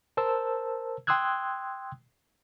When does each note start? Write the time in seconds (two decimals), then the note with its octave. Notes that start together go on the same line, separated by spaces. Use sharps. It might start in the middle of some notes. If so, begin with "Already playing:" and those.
0.17 A#4 C5 A5 E6
1.07 G5 C6 D#6 E6 F#6 G#6